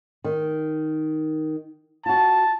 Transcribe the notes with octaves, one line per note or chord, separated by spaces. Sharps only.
D#3
F4 F#4 A5